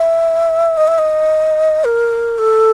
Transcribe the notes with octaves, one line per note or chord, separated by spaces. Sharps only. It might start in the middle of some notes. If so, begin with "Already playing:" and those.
Already playing: E5
D#5
E5
D#5
A#4
A4